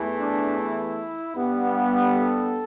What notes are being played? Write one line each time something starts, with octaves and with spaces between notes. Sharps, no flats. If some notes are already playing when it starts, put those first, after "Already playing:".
Already playing: E2 E3 A3
D4
E4
G2 G3 B3
A4